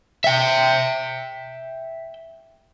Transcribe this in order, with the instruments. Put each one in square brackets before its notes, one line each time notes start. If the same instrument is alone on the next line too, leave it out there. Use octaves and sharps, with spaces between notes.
[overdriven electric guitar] E5 G5